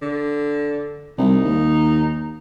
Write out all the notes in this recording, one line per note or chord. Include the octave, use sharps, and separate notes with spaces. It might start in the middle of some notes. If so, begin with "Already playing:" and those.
D3
C2 D#4
D#2